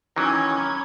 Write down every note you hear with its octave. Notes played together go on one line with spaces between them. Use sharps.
D#3 E3 F#3 C#4 A#5 B5 D6 G#6